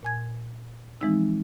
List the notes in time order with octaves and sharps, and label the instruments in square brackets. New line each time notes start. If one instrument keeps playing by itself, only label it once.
[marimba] A#2 G#5 G#6
E3 F3 G#3 C4 D#4 E6